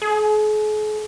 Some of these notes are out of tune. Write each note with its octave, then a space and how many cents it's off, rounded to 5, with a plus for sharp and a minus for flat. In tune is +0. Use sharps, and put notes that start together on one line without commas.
G#4 +45